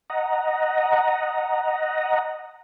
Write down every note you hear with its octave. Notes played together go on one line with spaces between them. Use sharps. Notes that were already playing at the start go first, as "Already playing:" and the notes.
D#5 F#5 A#5